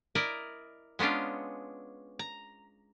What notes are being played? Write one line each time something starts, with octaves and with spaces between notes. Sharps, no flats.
E4 A#4 D5 D#5
G#3 B3 C#4 D4 F4
A#5